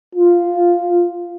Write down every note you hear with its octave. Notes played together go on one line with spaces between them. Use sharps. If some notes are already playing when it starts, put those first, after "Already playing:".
F4